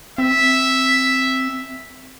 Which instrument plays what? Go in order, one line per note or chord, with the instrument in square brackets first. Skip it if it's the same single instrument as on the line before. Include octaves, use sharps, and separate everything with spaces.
[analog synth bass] C4 [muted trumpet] E5